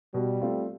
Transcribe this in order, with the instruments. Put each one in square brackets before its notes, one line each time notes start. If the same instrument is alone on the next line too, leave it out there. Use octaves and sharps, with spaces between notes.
[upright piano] B2 [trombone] G3
[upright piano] A3 C4 F4